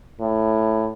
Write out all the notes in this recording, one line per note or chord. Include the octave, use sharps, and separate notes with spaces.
A2